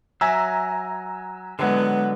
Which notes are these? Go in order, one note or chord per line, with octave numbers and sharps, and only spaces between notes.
F#3 E5 G#5 A#5 E6
D3 F#3 G#3 B3